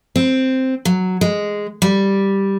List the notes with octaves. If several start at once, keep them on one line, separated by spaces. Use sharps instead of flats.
C4
F#3
G#3
G3